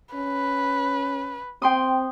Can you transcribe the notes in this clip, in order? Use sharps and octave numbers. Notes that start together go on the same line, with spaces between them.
C#4 B4
C4 G5 C6 D#6